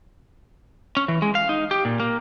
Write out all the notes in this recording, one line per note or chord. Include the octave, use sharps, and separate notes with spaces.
C#4
E3
G#3
F5
D#4
G4
A#2
A#3